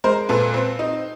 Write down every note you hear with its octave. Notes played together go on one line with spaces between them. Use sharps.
G#3 A#4 C5
A#2 A4 B4
C4
D#4